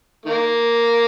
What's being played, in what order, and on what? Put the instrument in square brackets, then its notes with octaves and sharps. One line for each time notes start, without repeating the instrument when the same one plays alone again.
[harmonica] D#3 A#3